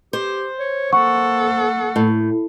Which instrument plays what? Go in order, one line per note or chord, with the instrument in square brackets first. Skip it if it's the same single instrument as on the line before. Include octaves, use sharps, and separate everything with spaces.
[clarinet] G4 [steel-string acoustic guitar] C5
[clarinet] C#5
[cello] A#3 A4 [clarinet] F#5 [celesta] C#6
[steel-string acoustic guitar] A2